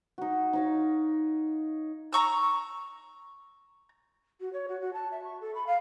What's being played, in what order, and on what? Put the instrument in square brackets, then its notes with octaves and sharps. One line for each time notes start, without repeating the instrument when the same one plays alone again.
[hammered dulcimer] D#4 F#4
D#4 C#5 F5
[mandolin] A#5 C#6 E6
[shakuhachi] F#4
C#5
F#4
F#4
A5
E5
C#6
A4
B5
F5